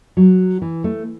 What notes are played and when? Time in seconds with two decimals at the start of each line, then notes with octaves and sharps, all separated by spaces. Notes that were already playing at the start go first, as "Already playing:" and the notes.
0.17 F#3
0.62 E3
0.84 A3